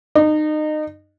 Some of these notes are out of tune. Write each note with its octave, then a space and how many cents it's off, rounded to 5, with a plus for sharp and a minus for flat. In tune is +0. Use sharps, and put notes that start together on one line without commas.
D#4 -25